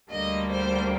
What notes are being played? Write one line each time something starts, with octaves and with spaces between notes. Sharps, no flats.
D2 D3 G3 A#3 D#5
C5